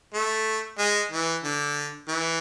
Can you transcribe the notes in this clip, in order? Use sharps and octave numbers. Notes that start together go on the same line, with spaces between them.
A3
G#3
E3
D3
E3